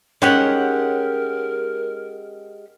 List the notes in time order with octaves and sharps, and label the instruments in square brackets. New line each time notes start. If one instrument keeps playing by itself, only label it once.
[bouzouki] G#3 G4 F#5 [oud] C#4 D#4 [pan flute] A#4